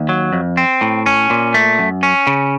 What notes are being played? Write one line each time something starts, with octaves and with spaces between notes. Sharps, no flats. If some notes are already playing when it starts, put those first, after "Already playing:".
Already playing: D#2
F#3
F2
C4
A2
C#4
A#2
A3
F#2
C#4
C#3